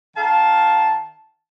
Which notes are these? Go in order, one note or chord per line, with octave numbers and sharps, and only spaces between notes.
D#3 F5 A5